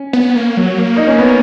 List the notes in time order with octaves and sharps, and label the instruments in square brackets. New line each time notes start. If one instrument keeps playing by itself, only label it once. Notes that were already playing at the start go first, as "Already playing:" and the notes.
Already playing: [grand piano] C#4
[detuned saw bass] B3
A#3
F#3
A#3
[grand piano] D#4
C#4
B3